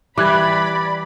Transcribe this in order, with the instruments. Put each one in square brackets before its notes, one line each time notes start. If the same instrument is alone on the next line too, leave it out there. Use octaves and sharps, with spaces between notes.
[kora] E3 G3 [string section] D5 B5 [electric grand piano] D6 F#6 G#6